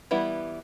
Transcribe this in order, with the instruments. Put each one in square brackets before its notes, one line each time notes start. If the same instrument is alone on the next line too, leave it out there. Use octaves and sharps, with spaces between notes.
[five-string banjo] E3 G3 B3 E4